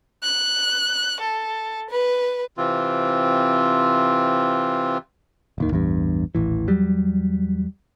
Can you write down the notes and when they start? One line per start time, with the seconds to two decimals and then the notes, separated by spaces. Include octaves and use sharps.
0.23 F#6
1.20 A4
1.90 B4
2.57 C3 E3 C4 F4
5.58 D1 D#2 D#3
5.71 A1 E2 G2
6.35 D#1 A1 E3
6.67 E2 F#3 G3